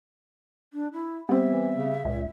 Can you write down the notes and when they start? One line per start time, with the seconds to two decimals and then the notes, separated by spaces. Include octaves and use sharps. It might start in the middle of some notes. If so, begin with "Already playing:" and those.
0.73 D4
0.93 E4
1.29 G3 B3 C4 E5
1.50 E3
1.76 C#3
2.05 C#2 A#2